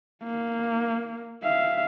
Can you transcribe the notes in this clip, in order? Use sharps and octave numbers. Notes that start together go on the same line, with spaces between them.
A#3
E5 F5